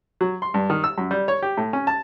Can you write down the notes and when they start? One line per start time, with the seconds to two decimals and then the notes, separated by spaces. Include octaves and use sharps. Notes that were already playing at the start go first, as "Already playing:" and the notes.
0.21 F#3
0.42 C6
0.54 G2
0.70 D#3
0.84 E6
0.98 F#2
1.11 G3
1.28 C#5
1.42 G4
1.57 A2
1.73 C#4
1.87 A5